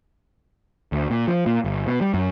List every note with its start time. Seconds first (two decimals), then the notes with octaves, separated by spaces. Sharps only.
0.92 D2
1.10 A#2
1.28 F3
1.46 A#2
1.64 G1
1.87 B2
2.01 G3
2.14 F#2